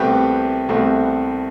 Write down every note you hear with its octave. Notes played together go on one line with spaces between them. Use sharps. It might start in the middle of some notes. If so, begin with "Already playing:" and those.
Already playing: C2 B2 A3 C4 G4 B4
C2 B2 A3 C4